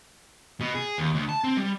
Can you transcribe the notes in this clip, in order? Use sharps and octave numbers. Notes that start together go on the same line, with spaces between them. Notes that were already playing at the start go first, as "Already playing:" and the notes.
B2
G#4
D#2
D2
A5
C4
G3